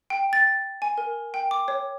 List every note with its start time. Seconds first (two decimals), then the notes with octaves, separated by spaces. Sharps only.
0.10 G5
0.33 A6
0.82 G#5
0.98 A#4
1.34 G5
1.51 D6
1.68 C#5